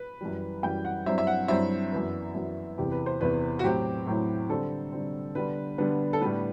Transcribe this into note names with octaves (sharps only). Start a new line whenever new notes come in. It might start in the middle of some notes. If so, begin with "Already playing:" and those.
Already playing: B4
F#2 E3 G3
F#2 E3 G3 G5
F#5
G2 F#3 C4 E4 E5
E5
F#5
G2 F#3 C4 E4 E5
F#2 E3 B3
F#2 E3 B3
E2 C3 E3 B3 E4 G4
B4
C5
E2 C3 E3 B3 E4 B4
F#4
A2 F#3 C4 E4 G4
A2 F#3 C4 E4
D3 G3 C4 A4
D3 G3 C4
D3 G3 B3 D4 B4
D3 G3 B3 D4
A4
A2 G3 B3 D4 B4